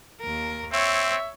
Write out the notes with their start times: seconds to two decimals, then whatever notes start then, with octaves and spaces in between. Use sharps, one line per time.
0.21 D#2 A#4
0.73 C4 C#5 E5